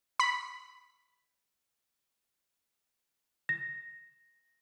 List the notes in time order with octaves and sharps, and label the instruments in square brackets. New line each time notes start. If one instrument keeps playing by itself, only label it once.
[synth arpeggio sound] B5 B6
[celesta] A#6